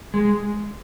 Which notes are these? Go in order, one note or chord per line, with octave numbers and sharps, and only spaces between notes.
G#3